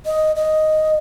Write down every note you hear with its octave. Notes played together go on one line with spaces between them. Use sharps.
D#5
D#5